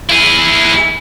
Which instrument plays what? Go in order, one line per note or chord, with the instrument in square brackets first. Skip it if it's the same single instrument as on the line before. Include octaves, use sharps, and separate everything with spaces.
[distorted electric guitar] E4 G#4